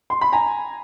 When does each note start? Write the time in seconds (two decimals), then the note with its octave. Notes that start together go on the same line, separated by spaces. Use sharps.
0.10 C6
0.21 B5
0.33 G#5 A#5